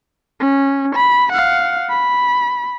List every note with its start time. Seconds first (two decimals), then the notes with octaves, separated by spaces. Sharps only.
0.40 C#4
0.95 B5
1.32 F5 F#5
1.89 B5